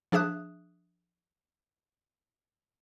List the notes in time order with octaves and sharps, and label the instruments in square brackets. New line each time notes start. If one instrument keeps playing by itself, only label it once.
[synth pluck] F3 D4 G#4 E5 D#6 F#6